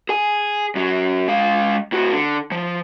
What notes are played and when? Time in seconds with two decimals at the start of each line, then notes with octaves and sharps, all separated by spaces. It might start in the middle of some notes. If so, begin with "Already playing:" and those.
0.09 G#4 G#5
0.76 F#2 F#3
1.28 G#3 F5
1.92 A2 F#4
2.13 D3
2.52 F3